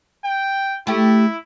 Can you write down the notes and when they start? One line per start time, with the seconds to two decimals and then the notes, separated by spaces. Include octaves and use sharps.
0.24 G5
0.87 A3 E4 G4